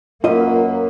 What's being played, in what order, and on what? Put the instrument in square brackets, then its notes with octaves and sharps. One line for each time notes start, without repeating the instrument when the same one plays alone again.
[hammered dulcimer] F#2 B4 [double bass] A#3 [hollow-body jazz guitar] F4 D#5